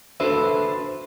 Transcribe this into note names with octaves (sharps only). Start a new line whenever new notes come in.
D4 F#4 A4 B4 C5 E5